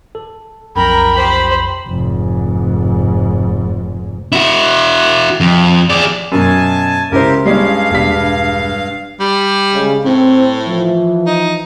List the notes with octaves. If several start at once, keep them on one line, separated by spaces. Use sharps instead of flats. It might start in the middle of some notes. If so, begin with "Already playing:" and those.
A4
B1 F2 A#4 G5 A#5 B5
G4 C5
F1 G#2
E4 F#4
F2
G#4 D5
F#2 B2 G#5 A5
C#2 E4 G4 A#4 C5
G2 G3 G#3 C#4 F5
E1 G3 B6
G3
C#3 G#3
A2 C4
E3 F3
D#4